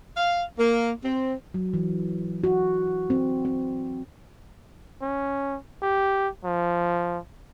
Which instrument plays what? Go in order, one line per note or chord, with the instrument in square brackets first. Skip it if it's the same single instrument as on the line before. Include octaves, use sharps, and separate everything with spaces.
[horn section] F5
A#3
C4
[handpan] F#3
E3
F#4
C4
C4
[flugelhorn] C#4
G4
F3